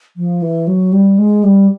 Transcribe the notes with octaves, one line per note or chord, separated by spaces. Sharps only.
F3
E3
F#3
G3
G#3
G3